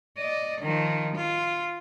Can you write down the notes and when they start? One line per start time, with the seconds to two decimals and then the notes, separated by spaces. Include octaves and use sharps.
0.18 D5 D#5
0.61 D#3 F3
1.15 F4